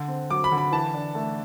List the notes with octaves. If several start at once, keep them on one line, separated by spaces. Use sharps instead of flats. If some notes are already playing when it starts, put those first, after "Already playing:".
Already playing: D3
C4
F#3 D6
B5
D3
B5
E3 A5
D4
A3